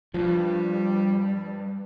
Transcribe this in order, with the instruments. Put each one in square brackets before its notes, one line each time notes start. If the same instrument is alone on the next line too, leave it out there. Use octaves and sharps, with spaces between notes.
[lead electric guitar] C#2 G2 [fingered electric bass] F3 [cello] G3